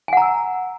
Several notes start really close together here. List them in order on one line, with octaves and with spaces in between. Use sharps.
G#5 F#5 A#5 E6